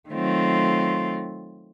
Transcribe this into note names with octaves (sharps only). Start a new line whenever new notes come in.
D#3 F#3 A3 C4 F4